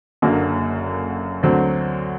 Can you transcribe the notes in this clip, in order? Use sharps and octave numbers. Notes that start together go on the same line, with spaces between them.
F#1 F#2 D3 F#3 A#3
D2 D3 F#3 C4